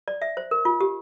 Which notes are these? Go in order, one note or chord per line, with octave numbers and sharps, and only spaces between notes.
D5
E5
C5
A#4
F4
G4